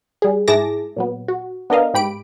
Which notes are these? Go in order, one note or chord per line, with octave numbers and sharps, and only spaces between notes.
G3 G#4
G#2 E4 G#4 A5 D6 A#6
A#2 F#3 B3
F#4
B3 D4 A#4 D#5 F5
G#2 G4 B5 D7